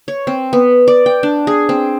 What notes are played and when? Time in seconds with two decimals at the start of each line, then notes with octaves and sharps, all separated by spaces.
0.08 C#5
0.27 C4
0.53 B3
0.88 D5
1.06 G5
1.23 D4
1.47 G#4
1.69 C4